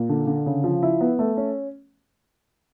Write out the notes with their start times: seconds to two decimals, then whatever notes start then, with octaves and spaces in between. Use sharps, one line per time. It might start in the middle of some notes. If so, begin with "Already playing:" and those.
Already playing: A#2
0.09 D3
0.27 D3
0.46 C#3
0.64 F3
0.83 E4
1.01 B3
1.19 A3
1.37 C#4